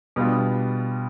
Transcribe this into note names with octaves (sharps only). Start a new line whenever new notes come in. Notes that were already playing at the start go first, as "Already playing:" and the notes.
B2 G3 B3 D4 F4